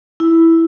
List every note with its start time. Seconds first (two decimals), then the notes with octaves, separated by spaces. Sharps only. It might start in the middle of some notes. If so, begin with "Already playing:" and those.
0.20 E4